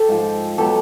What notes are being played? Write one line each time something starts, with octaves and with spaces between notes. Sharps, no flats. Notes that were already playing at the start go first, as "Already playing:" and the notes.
Already playing: G4 A4
G#2 F3
B2 F#3 G4 A4